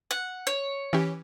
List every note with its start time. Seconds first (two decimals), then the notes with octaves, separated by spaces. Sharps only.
0.11 F#5
0.47 C#5
0.93 E3 C#4 G4